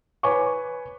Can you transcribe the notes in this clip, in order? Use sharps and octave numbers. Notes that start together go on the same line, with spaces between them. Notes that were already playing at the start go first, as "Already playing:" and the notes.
B4 C#5 G#5 C#6 D6